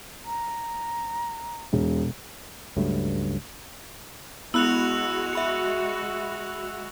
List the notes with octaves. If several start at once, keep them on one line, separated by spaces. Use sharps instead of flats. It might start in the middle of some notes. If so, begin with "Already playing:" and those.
A#5
E1
C#2 G2 F#3 A3
G#3 B3 E4 F#4 B5 E6 F#6 F7
E5 B5 C#7